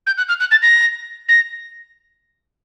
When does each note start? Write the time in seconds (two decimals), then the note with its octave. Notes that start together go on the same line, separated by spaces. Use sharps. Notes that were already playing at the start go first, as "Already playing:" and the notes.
0.07 G6
0.17 F#6
0.29 F6
0.40 F#6
0.51 A6
0.62 A#6
1.29 A#6